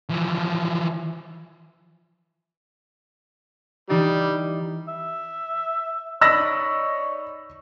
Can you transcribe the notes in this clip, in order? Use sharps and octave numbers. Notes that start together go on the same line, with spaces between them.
E3 F3
E3 G3 D#4 D5
E5
D#4 C#5 D5 B5 E6 A#6